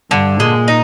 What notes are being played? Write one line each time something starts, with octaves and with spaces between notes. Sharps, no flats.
G2 D3
A#2 G#3
D#4